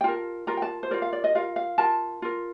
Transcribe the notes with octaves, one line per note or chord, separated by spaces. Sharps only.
G5
F4 A#4 A5
F4 A#4 A#5
G5
A5
C5
F4 A#4 D5
F5
D5
D#5
F4 A#4 F5
F5
F4 A#4 A5
F4 A#4